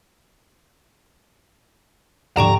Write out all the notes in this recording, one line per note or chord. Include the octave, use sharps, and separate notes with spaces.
D#1 G#2 D3 F3 G4 G5 A#5 C#6